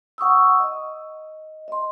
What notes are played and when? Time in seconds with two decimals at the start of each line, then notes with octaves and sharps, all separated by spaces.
0.18 F#5 C#6 D#6 E6
0.60 D#5
1.68 D#5 C6